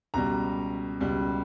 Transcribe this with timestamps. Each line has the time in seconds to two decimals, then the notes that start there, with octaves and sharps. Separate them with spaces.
0.14 C#2 B2 G3 A#5
1.00 C#2 B2 G3